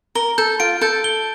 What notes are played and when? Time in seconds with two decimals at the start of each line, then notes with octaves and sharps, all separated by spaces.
0.15 A#4 G7
0.38 A4 G6
0.60 F4 D7
0.81 A4 G6
1.04 G7